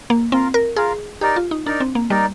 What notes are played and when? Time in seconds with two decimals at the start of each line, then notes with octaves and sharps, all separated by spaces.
0.10 A#3
0.32 C4 F4 A#4 F5
0.54 A#4
0.76 F4 G#4 A#4 F5
1.21 D#4 G4 A#4 D5
1.36 F4
1.51 D#4
1.66 D4 D#4 A#4 D5
1.80 C4
1.95 A#3
2.10 G3 D#4 A#4 D5